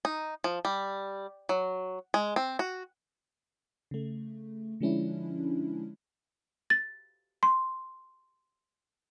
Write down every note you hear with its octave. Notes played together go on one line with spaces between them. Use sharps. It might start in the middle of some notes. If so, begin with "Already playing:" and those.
D#4
F3
G3
F#3
G#3
C4
F#4
C#3 A3
D3 F3 G#3 C#4 D4 E4
A6
C6